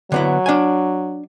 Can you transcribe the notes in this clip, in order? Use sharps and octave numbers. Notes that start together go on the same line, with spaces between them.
D3 F#3 B3 E4
D4 G#5